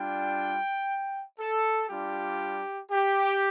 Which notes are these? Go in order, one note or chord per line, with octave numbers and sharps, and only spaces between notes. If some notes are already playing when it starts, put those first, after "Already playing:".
Already playing: G3 D4 F4 G5
A4
G3 D4 F4 G4
G4